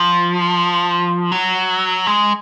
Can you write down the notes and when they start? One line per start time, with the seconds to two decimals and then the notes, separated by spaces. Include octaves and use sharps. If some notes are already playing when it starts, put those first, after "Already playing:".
Already playing: F3
1.32 F#3
2.07 G#3